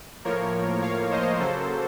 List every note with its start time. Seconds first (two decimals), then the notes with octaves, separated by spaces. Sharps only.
0.25 A2 F3 A#3 A#4 C#5
0.82 C#5 F5
1.11 C5 D#5
1.39 C#3 F#3 A#3 A4 C5